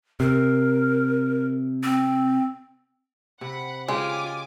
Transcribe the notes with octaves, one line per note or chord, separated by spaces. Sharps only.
C3 A#4
C4
C3 F#5 B5
C#3 G#3 F4 G4 G#5 D6